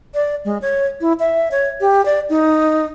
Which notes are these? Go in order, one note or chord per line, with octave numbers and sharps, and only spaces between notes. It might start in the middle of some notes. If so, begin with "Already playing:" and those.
D5
G#3
C#5
E4
E5
C#5
G4
D5
D#4